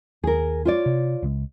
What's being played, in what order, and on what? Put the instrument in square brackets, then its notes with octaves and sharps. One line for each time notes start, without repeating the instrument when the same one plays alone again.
[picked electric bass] D#2 [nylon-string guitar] G#4 A#4
[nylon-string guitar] F4 C#5 D5
[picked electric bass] C3
C#2 C#3 G#3